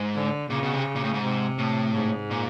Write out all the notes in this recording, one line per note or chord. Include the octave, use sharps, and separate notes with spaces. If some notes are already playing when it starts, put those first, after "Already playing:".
Already playing: G#2
D3
A#2 C#3
B2
C3
A#2
A2
G#2
C3
A2
G#2
A#2